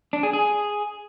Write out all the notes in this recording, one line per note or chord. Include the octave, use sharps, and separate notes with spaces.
D4
G#4
G#4